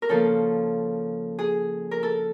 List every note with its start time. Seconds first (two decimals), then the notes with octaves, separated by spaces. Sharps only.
0.02 A#4
0.09 C#3 F3 A#3 A4
1.39 G#4
1.91 A#4
2.03 A4